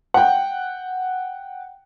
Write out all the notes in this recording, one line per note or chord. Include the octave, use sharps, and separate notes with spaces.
F#5 G5